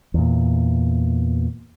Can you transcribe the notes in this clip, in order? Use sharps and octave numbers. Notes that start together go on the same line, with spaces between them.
E2 A#2